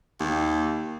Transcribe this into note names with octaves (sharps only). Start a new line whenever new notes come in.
D#2